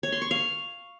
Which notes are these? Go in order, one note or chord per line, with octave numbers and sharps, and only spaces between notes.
C#5
C6
C#6
F5